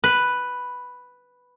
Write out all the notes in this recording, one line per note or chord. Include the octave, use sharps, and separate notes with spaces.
B4